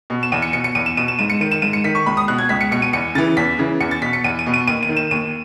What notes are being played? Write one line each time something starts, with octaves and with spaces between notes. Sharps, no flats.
B2
E7
E2 D#7
C#7
B2 C#7
C#7
E2 D#7
E7
B2 D#7
E7
G#2 D#7
C#7
D#3 D#7
E7
G#2 D#7
C#7
D#3 B6
C#6
C#2 B5
D#6
B2 F#6
G#6
C#2 B6
C#7
B2 C#7
D#7
E2 C#7
C#3 E3 A6
E2 B6
C#3 E3
E2 C#7
A6
B2 B6
C#7
E2 D#7
D#7
B2
D#7
D#2 D#7
D#7
D#3
E7
D#2 D#7